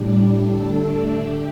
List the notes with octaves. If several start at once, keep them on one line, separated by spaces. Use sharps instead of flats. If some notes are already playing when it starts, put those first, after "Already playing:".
Already playing: A2 G3 D4
D3 A3 D4 A4
G4